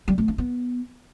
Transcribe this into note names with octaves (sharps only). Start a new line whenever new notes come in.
G3
A3
D4
B3